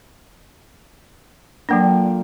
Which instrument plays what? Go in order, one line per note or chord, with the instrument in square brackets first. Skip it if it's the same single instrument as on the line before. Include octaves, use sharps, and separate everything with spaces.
[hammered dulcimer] A#2 D3 G5 [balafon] F#3 A#3 D4